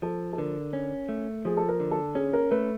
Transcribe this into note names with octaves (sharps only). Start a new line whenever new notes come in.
F3 A4
A4
D3 A#4
C#4
A3
F3 G#4
A4
A#4
D3
A4
C#4 G#4
A#4
A3 B4